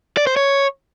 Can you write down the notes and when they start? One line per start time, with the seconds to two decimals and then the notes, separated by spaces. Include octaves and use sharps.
0.17 D5
0.27 C5
0.36 C#5